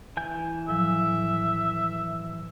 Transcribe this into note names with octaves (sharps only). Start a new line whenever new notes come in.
E3 G#5 G6
A2 F3 F#3 E5